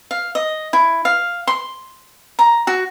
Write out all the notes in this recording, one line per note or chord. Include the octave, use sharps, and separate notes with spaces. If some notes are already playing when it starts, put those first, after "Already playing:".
F5
D#5
E4
F5
C6
A#5
F#4